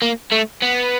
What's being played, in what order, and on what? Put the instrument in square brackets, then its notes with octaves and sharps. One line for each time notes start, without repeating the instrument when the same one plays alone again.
[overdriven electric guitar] A#3
A3
B3